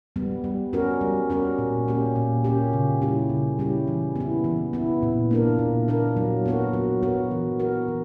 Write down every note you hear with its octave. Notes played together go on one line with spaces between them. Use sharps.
G3 B3
G3
C#4 F#4 A#4
G3
C#4 F#4 A#4
A#2
A#3 C#4 G4
A#2
A#3 C#4 G4
C#3
G3 C#4 E4 G4
C#3
G3 C#4 E4 G4
E3
B3 E4
E3
B3 E4
A#2
A#3 D4 A#4
A#2
A#3 D4 A#4
F#3
B3 F#4 A#4
F#3
B3 F#4 A#4
E3
B3 F#4 A#4
E3